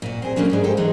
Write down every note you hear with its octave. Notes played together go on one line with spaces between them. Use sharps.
A#2 F#4
C4 G#4
F#3 G3 A3 A#3 C#4 D4
G#2 G3 G#3
F#4 A4 C5 G5 G#5
E3 F#3 G#3 A#3 C4 D#4